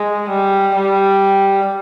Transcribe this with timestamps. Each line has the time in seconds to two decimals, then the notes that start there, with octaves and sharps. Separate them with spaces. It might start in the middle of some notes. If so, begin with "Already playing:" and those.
Already playing: G#3
0.29 G3
0.75 G3